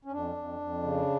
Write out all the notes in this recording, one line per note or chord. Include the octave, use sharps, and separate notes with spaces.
C#4
F2 D4
F2
F2
C#3